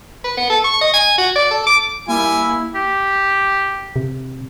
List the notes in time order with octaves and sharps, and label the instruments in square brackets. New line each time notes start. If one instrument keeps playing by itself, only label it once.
[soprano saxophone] B4
B3
A4
C#6
D#5
G#5
F#4
D5
A4
D6
[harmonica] G3 G#5 [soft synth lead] A#3 [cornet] E4
[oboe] G4
[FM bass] C3